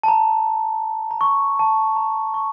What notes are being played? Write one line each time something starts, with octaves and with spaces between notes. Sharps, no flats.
A5
A#5
A#5
C#6
A5
A#5
C#6